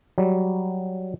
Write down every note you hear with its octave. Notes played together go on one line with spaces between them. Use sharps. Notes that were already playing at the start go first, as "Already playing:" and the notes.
F#3 G3